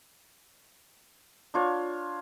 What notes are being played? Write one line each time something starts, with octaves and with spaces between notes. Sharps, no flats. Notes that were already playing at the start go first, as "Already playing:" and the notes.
D4 F4 C#5